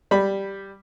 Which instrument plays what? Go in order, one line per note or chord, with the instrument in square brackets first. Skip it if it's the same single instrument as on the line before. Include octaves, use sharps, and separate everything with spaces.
[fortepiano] G3 B5